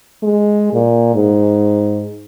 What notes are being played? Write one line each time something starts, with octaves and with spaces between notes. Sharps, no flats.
G#3
A#2
G#2